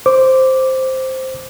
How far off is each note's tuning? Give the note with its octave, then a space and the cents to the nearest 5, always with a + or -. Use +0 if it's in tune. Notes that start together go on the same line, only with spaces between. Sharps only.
C5 +0 D6 -5